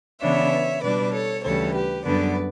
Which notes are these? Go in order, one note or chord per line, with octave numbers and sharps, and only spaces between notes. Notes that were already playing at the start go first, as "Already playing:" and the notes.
C#3 E3 B3 D4 C#5 E5
B2 G3 D4 B4 D5
A4 C#5
D2 C#3 E3 G3 A4 C#5
G4 B4
F#2 D3 G3 B3 B4 D5